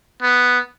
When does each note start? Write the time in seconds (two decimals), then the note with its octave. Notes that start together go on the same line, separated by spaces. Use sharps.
0.22 B3